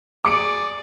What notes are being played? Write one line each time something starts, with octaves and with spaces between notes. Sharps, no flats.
G#4 D5 D6 C#7 D7